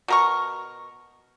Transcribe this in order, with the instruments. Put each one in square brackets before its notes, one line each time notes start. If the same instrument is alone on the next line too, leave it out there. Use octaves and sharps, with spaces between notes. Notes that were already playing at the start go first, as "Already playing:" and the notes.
[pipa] B2 A#4 C#6